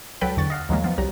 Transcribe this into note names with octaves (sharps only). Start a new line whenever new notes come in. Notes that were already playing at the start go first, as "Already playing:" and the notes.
C#2 F#3 A4 B4 G5 B5
E2 D3 C#6 A6
D#5 F5 F#5
D#2 D#3 F3 F#3 G#3 A#3
F3 B3
C2 F#3 G3 A#5